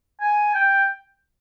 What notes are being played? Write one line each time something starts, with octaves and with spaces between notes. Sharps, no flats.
G#5
G5